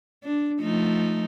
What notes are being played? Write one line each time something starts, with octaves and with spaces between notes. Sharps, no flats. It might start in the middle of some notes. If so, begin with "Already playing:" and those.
D4
F3 A3 D#4